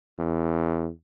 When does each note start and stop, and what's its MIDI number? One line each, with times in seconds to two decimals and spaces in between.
0.19 0.90 40